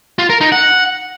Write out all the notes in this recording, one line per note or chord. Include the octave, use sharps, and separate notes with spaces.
F4
A#4
D#4
F#5